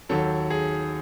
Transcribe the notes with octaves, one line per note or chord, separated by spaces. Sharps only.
D#2 D#3 F#3 A4
G#4